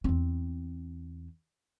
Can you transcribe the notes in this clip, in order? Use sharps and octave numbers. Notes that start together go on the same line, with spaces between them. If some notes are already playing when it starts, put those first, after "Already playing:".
E2 C4